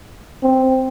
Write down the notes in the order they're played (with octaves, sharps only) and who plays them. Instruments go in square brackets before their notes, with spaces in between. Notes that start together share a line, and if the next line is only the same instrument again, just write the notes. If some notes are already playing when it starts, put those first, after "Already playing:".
[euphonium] C4